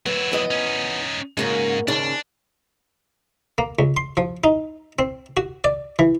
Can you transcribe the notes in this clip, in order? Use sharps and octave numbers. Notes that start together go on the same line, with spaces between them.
F#3 B3 E4
E3 B3 D#5
C#4 D#4
G#2 C#3 A#3 F#4
D#2 G#2 C#3 D4
A#3
C#2
C6
F3
D#4
C4
F#4
D5
E3